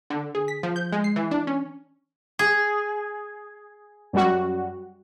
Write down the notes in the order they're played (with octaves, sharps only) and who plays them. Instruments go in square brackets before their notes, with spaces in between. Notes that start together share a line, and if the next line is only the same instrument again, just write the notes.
[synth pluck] D3
G#4
B6
F3
G6
G#3
C7
E3
D4
C#4
[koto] G#4
[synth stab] F#2 G3 F#4